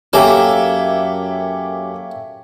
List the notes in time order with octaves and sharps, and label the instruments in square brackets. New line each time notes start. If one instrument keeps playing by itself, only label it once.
[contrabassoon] F#2 [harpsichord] A#3 A4 [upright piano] G4 G#5 [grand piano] C#5 E5 G5